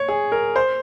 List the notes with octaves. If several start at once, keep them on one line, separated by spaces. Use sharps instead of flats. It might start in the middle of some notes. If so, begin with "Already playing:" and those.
Already playing: C#5
G#4
A#4
C5